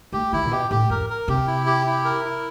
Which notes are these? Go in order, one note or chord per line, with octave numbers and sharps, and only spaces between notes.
A3 G4
D#3 E4
A#2
B2 G4
A2 G4
F2 A#4
A#4
C3 G4
E4
G4
E4
A#4
E4